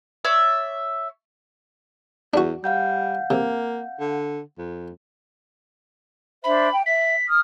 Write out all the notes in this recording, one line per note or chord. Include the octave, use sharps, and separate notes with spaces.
C#5 D5 E5 E6
E2 D4 F#4
G3 F5 F#5 G6
C3 A#3
D3
F2
D4 C5 E5 B5
G5
E5 B6
D#6 F6